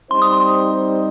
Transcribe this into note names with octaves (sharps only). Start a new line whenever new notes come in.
G3 C4 D#4 C5 C6
D#6
C6